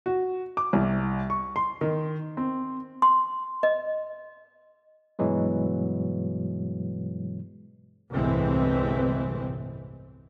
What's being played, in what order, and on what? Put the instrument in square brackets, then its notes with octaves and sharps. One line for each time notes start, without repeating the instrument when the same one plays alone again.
[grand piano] F#4
D6
C2
C#6
C6
D#3
C4
[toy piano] C6
D#5
[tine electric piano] G2 B2 E3 F#3 G#3
[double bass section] G1 C2 A2 E3 G#3 C4